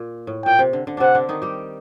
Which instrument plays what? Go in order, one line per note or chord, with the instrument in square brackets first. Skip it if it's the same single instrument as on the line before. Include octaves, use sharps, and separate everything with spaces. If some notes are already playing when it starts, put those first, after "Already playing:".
Already playing: [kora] A#2
A2
[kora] A#2 [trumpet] G5
[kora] C3
D3
D3
[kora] C3 C4 D4 [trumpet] F#5
[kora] D3 D4
D#3 D#4
G3 G4